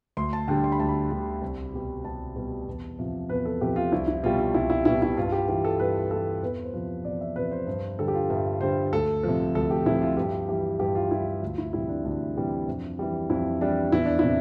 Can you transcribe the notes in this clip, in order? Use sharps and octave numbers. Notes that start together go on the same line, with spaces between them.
D2 C6
A5
D3 G3 G5
C6
B5
D2 A5
B5
D3 G3
C2
B2 G3
C2 A5
B2 G3
E2
C3 F3
E2 B4
A4
C3 F3 G4
F4
C2 E4
E4
B2 G3 F4
F4
C2 E4
E4
B2 G3 E4
E4
G2 F4
G4
E3 G3 G4
A4
G2 B4
E3 G3 A4
E2 B4
C5
C3 F3
E2 D5
E5
C3 F3 B4
C5
G2 C5
D3 G3 A4
G4
F4
G2 E5
D3 G3 C5
D2 A4
C3 F3
D2 A4
G4
C3 F3 E4
F4
G2 G4
E3 G3 G4
G2 G4
F4
E3 G3 E4
F4
D2 F4
E4
C3 E3 G3 E4
D4
D2 D4
C3 E3 G3
F2
E3 G3
F2 E4
E3 G3 D4
E2 E4
D4
C3 E4